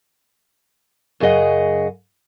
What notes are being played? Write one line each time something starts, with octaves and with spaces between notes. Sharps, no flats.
F#2 C#3 D4 G#4 D#5 F#5